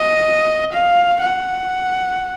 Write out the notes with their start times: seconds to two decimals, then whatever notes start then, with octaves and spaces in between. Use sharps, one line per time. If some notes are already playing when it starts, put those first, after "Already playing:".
Already playing: D#5
0.73 F5
1.21 F#5